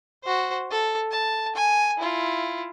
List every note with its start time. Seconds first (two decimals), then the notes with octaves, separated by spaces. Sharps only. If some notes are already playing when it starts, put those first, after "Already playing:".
0.24 F#4 C5
0.71 A4
1.11 A5
1.55 G#5
1.98 E4 F4